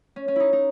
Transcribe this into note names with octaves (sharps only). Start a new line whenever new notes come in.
C#4
C#4
D#4 E4
D#4